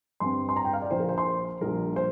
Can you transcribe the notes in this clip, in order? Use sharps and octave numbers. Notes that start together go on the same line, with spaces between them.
G2 G3 C4 C6
C6
A#5
G5
F5
D5
A#1 A#2 A#3 C5
A#4
C5
C6
A#1 A#2 G3 A#4
C5